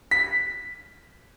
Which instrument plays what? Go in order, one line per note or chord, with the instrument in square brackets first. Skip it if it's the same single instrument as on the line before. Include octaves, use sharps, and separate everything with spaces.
[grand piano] B6